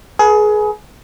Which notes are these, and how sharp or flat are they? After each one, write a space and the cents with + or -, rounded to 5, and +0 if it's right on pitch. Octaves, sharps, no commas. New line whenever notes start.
G#4 +25 B4 -35